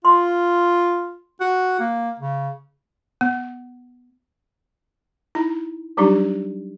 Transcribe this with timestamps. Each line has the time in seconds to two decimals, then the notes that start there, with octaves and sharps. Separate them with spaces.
0.05 F4 C6
1.40 F#4
1.80 A#3
2.19 C#3
3.21 B3
5.35 D#4 E4 A#5
5.97 F#3 G3 D4 D#4 G4